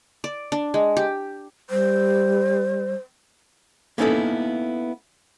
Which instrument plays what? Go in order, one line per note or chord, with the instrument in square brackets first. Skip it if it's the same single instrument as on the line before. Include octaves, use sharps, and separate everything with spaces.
[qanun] D5
D4
G#3
G4
[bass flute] G3 [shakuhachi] C5
[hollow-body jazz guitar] A#3 B3 C#4 D#4 E4 A4